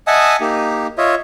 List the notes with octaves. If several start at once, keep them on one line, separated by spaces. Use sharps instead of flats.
D#5 E5 F#5 G#5 A5 D#6
A#3 D#4 G4
F4 C#5 D#5 E5